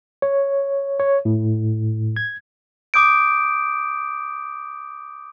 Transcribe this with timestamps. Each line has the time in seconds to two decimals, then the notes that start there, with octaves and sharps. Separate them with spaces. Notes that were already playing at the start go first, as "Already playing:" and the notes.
0.22 C#5
1.00 C#5
1.25 A2
2.16 G#6
2.94 D6 D#6 G6 D7